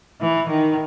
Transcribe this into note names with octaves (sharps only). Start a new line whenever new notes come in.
E3
D#3